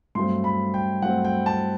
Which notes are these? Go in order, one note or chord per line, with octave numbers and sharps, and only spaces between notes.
G2 F#3 A3 C4 C6
B5
G5
G2 F#3 A3 C4 F#5
G5
A5